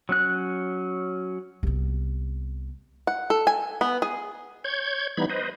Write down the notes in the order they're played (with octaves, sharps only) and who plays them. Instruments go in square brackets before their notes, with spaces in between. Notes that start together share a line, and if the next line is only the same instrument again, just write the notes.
[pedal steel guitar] F#3 C#4 F#6
[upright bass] C2 B3
[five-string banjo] F#5
A4
G#5
B3
G#4
[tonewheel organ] C#5 G6 G#6
E3 G3 B3 D#4 B5 G#6
B4 C5 D#5